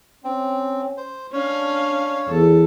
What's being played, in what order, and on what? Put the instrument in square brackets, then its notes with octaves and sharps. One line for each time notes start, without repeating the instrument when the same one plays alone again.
[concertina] C4 [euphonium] C#4
[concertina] C5
[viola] C#4 F5 [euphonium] D4 [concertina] C#5
[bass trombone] E2 [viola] A4